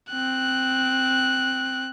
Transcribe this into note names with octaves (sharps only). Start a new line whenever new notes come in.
C4 F#6